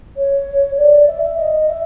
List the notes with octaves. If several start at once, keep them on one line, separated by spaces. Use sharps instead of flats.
C#5
D5
E5
E5
D#5
E5